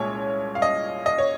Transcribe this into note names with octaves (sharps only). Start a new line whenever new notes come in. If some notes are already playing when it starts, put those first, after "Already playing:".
Already playing: C2 A#2 G#3 C#4 C#5
F5
D#5
D#5
C#5